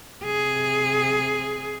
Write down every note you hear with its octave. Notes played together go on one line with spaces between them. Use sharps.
C3 G#4